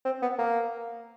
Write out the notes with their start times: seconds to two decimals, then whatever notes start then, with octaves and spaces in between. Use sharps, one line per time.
0.05 C4
0.22 B3
0.39 A#3